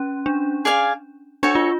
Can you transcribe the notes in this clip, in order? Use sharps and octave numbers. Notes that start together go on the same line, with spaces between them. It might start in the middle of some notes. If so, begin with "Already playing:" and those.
Already playing: C#4
D4
G#4 D5 F5 G#5
D4 F#4 A4 C#5
F4